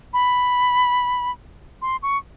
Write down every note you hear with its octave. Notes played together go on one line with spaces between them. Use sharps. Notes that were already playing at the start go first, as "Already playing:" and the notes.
B5
C6
C#6